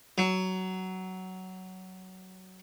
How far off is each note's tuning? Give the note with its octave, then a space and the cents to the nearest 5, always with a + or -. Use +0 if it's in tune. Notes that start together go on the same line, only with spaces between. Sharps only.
F#3 +15